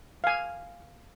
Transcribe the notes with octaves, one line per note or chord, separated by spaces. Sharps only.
F5 G#5